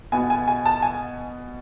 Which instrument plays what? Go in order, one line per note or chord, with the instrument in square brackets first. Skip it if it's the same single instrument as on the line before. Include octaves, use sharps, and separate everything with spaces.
[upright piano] B2 B3 G#5
G#5
G#5
A5
G#5